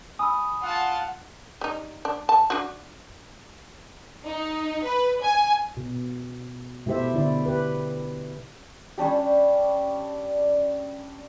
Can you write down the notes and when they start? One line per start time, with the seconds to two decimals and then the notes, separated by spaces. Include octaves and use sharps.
0.19 G#5 B5 D#6 E6
0.62 F4 F#5 A5
1.61 G3 D#4
2.05 D4
2.29 A5
2.50 D4 F#4
4.25 D#4
4.84 B4
5.22 G#5
5.77 B2
6.86 B2 A3 E4 G4 C5 E5
7.13 B2 D3 E4 D5
7.46 G4 B4
8.98 G3 C#4 D4 G4